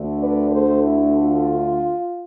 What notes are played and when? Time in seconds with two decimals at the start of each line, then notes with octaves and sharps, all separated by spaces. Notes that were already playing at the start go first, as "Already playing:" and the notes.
Already playing: D2 D3 A3
0.19 B4 D5
0.51 A4 C5
0.83 E4
1.16 F4